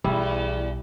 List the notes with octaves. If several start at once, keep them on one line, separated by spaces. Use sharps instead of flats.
B1 E2 G3 E4